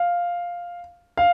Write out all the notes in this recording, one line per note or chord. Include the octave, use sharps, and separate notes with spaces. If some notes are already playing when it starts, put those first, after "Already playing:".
Already playing: F5
F5